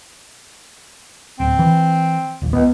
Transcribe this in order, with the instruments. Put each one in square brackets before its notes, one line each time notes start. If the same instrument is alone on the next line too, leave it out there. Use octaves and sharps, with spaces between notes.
[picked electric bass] D1 [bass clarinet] C4
[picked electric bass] E3
D#1 A#1
[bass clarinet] C#2 [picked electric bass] B3